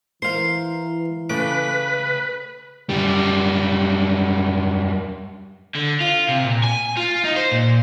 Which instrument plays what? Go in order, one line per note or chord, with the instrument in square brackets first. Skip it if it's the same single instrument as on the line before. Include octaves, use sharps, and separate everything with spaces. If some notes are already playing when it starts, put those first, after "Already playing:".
[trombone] E3 [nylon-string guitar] A#4 C5 [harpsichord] F5 C6
[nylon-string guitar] C#3 A3 G5 [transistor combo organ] B4 [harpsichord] D6
[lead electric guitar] F#2 G3
[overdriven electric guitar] D3
F4
C3
A#2
G#5
F4
D#4
C5
A#2